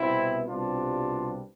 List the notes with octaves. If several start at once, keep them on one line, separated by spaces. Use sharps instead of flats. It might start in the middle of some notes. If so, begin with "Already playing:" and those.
Already playing: C2 B2 B3 C4 E4
C2 B2 G3 C4 D4 F4